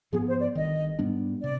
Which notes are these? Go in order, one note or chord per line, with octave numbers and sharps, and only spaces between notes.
G#2 F3 B3 G#4
C5
D5
G1 G2 D#3 D#5
G#2 G3 B3 D4
C3 D5